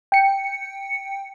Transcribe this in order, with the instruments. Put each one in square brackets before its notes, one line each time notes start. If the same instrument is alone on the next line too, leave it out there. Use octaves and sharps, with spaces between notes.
[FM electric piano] G5 C#7